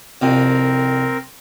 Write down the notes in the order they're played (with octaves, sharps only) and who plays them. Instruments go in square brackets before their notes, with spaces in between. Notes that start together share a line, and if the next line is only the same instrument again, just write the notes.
[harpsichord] C2 F2 [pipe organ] C4 A#4